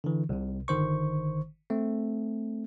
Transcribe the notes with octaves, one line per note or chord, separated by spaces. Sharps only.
D3 E3
C2 C3
G1 D3 D#3 C5 C#6
A3 C4